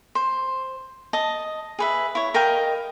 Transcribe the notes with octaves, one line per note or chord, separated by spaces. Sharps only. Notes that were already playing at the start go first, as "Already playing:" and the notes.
C5
D#5 A5
G#4 B4 E5
E4 C#5
A#4 D#5 F5 G5